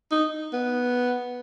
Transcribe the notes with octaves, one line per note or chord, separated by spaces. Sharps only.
D#4
B3